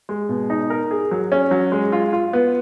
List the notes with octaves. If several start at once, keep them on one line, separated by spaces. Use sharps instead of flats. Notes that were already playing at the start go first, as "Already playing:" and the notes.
G#3
B2
D#4
A#4
G#4
F#3
C#4
F#3
G#3
F4
F4
B3